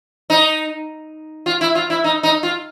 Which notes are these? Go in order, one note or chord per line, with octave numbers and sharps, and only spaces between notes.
D#4
F4
E4
F4
E4
D#4
D#4
F4